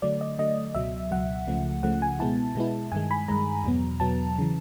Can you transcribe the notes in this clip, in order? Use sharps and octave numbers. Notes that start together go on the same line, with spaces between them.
D3 F#3 A3 D5
D#5
D3 F#3 A3 D#5
C#2 B2 F#3 E5
C#2 B2 F#3 F#5
C#2 C#3 F3 A3
C#2 C#3 F3 A3 F#5
G#5
B2 G#3 B3 E4 A5
B2 G#3 B3 E4
G2 D#3 G#3 G#5
B5
G2 D#3 G#3 A#5
E2 B2 F#3 B3
E2 B2 F#3 B3 A5
C#3 E3